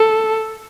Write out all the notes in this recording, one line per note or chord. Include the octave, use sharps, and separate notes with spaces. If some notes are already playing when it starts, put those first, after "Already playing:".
Already playing: A4